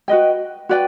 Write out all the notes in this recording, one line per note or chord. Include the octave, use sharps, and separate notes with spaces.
F#4 B4 D#5 G5
F#4 B4 D5 G5